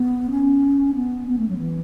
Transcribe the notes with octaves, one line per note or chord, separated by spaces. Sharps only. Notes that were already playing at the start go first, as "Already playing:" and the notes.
Already playing: B3
C#4
B3
B3
A3
F#3
E3